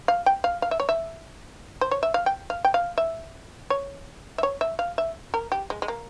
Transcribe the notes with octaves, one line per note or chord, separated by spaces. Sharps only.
F5
G5
F5
F5
E5
C#5
E5
C5
C#5
E5
F5
G5
F5
G5
F5
E5
C#5
E5
C#5
E5
F5
E5
A#4
G4
G#3
G#3
A#3